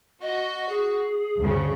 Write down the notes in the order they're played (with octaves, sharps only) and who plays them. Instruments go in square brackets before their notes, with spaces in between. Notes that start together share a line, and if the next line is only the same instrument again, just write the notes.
[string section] F#4 [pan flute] D#5
[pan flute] G#4
[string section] D2 G2 C#3